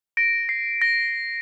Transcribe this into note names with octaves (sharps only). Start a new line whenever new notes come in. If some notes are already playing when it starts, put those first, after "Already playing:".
A#6 D7
C7
A#6